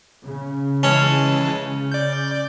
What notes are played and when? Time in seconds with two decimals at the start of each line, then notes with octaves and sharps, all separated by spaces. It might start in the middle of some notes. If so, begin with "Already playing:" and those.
0.24 C#3
0.83 E3 G#3 C#4 A5
1.92 D5 G6